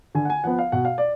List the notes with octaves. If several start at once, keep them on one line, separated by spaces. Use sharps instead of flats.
D3 G#5
F#5
G#5
F3 B3 F#5
F5
B2 F#5
F5
D5